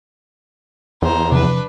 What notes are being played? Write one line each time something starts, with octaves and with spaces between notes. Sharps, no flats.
E2 C5 A#5
C3 F3 D4 B4